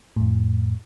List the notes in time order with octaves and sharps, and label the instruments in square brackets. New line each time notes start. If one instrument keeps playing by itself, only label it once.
[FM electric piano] F2 A2